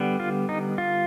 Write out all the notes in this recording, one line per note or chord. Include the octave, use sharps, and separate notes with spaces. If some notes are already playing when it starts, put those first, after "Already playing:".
Already playing: D3 G3 B3
F4
D#4
F4